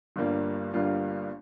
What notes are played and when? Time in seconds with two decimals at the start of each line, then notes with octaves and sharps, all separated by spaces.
0.16 G1 G2 G3 A#3 F4
0.74 G1 G2 G3 A#3 F4